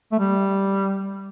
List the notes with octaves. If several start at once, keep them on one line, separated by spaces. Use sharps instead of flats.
A3
G3